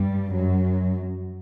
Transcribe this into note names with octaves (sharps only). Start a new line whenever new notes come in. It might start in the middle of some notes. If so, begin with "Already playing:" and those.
Already playing: G2 G3
F#2 F#3